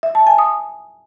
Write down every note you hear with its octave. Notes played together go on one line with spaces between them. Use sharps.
E5
A5
G#5
D#6